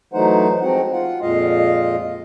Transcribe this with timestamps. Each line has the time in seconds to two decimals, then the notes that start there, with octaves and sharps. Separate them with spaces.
0.13 E3 F#3 A3 D#4 C5 F#5
0.62 F3 G#3 C4 F#4 F#5
0.93 F4 F#5
1.22 F2 A#2 G#3 F4 D#5 F5